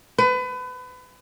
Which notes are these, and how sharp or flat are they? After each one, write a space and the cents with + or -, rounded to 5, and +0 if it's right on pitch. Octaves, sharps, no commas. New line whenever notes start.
B4 +30